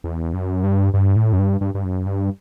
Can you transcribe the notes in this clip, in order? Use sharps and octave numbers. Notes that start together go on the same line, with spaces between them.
E2
F#2
G2
G2
A2
F#2
G2
G2
G2
F#2
G2